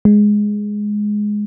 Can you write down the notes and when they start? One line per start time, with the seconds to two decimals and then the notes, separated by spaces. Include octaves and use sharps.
0.05 G#3